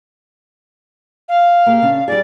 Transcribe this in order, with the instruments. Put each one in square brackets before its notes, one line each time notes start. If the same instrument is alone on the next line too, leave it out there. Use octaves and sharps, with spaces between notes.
[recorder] F5
[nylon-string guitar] A#3 G4 G#4
C#3 C#4 D4
[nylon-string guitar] G3 D#4 G#4 [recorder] D5